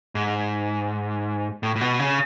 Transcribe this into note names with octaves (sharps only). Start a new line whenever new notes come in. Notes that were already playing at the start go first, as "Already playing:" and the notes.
G#2
A2
A2
B2
C#3